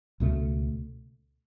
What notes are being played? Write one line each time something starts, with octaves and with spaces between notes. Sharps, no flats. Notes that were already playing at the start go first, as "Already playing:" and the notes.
C#2 B2 A3